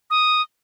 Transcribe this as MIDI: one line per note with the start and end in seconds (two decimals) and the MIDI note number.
0.10 0.42 87